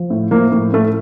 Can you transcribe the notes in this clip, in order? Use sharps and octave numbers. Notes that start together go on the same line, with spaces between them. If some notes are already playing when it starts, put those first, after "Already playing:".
Already playing: F3
A2
F3 A#3
A2
A2 A3